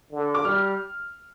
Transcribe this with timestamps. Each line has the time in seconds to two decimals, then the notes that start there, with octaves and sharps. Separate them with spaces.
0.12 D3
0.34 D6
0.45 G3 F6